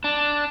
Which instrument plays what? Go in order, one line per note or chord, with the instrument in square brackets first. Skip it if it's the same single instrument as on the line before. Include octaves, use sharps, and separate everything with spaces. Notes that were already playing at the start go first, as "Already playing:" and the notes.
[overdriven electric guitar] D4